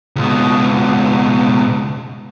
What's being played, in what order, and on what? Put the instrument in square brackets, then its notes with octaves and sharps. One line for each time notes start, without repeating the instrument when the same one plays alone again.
[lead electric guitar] C#2 B2